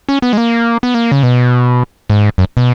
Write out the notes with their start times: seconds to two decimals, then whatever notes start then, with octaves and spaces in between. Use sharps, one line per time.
0.09 C#4
0.22 B3
0.33 G#3
0.37 A#3
0.83 B3
0.94 A#3
1.12 C#3
1.23 B2
2.10 G#2
2.38 F#2
2.57 B2